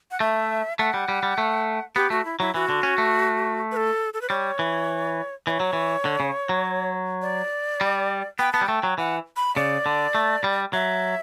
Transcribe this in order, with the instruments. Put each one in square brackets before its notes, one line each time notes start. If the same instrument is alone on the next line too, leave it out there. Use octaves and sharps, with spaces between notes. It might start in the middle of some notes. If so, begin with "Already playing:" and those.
[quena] F#5
[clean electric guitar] A3 [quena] E5
[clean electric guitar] A3 [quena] F#5
[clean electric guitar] G3
G3
G3
A3
[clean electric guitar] B3 [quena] G4
[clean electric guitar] A3 [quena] F#4
[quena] E4
[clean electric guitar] F#3 [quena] E4
[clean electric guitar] E3 [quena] F#4
[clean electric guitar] D3
C#4
A3
[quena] B4
A4
A4
B4
[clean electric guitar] G3 [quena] C#5
[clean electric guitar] E3
[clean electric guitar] E3 [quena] C#5 D5
[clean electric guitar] F#3
E3
D3
C#3
F#3
[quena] D5
[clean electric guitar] G3
[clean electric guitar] B3 [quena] G5
[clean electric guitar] B3 [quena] A5
[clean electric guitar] G3
[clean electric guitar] A3 [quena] G5
[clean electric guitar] F#3
[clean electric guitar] E3 [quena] F#5
[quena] B5
[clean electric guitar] C#3 [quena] D5
[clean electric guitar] D3
A3
G3
[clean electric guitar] F#3 [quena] E5